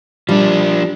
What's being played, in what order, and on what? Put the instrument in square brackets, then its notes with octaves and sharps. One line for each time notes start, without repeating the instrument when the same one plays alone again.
[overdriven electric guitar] F3 D4 [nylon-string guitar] G3